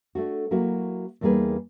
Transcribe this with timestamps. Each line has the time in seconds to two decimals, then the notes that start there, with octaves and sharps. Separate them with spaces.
0.15 A3 D4 F#4
0.51 F#3 A#3 E4 F#4
1.21 E2 G3 A#3 D#4 G#4 B4